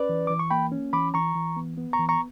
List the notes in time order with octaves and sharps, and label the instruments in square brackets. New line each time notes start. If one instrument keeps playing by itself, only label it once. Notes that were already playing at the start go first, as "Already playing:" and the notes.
Already playing: [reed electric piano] C#4 B4 D5
E3
E3 D6
C#6
A#3 G5 B5
C#4
E3 B5 D6
E3 A#5 C#6
E3
B3
B3
A#5 C#6
E3
A#5 C#6